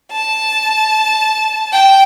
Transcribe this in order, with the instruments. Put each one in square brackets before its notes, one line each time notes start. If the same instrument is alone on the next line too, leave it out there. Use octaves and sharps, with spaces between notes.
[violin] A5
G5